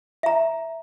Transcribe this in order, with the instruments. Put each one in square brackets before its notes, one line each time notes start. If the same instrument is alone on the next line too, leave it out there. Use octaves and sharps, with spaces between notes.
[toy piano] E5 A#5